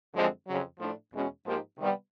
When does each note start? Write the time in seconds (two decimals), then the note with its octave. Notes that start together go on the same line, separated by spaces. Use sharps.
0.13 F#2 D3 F3 G#3 C4
0.47 F2 C#3 F#3
0.79 A2 F3 A3 D4
1.13 E2 B2 G#3 C#4 F#4
1.45 G#2 F3 A#3 D#4 G4
1.78 C3 D#3 G3 B3